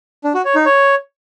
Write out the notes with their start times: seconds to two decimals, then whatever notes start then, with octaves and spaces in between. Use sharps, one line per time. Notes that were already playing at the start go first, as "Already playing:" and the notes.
0.24 D4
0.35 F#4
0.45 C#5
0.55 D#4
0.66 C#5